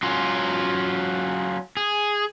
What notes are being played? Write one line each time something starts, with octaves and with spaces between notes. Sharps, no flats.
F#3 C#4 F4
G#4